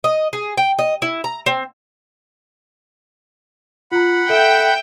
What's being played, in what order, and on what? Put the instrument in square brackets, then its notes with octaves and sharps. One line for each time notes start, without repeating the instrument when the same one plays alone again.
[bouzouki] D#5
G#4
G5
D#5
E4
A#5
C4
[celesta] F4 A#5 [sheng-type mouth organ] F#5 B5
[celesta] A4 [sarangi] E5 [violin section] G5